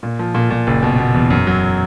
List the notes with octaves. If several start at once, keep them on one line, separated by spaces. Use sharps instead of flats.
A#2
F3
A#2
A#2
F#1
B2
B2
E2
F#2
F#3